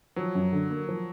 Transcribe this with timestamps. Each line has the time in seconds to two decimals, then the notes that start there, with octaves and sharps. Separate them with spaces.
0.16 F3 F#3
0.35 F#2
0.52 D3
0.70 A#3
0.88 F3